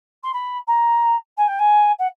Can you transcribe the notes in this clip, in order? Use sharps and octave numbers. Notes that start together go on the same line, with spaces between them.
C6
B5
A#5
G#5
G5
G#5
F#5